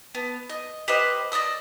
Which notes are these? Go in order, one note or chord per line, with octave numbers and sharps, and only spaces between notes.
B3
D#5
G4 B4 C5 D#5
D5 D#5 D#6 E6